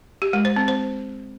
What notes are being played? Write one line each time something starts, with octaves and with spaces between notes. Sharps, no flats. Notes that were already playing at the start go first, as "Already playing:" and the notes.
G4
G#3
C5
C4
C5